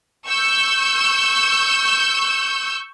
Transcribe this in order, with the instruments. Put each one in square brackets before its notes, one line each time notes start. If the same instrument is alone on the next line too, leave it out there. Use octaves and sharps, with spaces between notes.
[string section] C#6 E6 G6